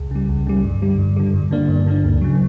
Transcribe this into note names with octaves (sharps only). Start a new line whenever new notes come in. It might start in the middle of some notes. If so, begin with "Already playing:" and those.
Already playing: C#2
C#3 G3
C#2
C#3 G3
G2
D3 G3
G2
D3 G3
G2
D3 A#3 D4
G2
D3 A#3 D4
D2
C#3 F#3